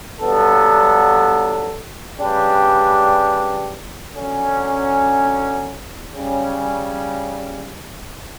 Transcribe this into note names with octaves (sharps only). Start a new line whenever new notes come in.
G2 F#3 B3 D4 A4
C#3 G3 D4 G4 B4
D3 F#3 C#4
C#3 G3 C#4